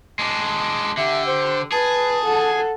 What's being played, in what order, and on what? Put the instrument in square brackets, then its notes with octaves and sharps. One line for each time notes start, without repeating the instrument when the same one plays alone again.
[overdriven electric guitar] G#3 D4
[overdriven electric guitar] D3 [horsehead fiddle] G4 [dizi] E5
[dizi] C5
[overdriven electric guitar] G#4 [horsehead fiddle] B4 [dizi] A5
[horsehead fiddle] A4 F#5